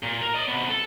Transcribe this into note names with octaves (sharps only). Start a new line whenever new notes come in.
A#2
A#4
D5 D#5
C3 B3
A4